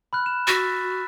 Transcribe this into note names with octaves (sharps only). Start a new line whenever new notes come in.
B5 F6 F#6
E7
F#4 E6 A6 B6